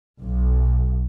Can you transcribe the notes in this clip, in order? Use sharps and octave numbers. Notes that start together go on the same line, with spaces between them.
B1